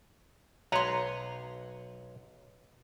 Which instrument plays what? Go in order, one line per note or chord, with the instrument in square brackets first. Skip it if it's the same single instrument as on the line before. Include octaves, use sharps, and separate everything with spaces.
[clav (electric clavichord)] B1 B4 C#5 [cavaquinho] A#5 C6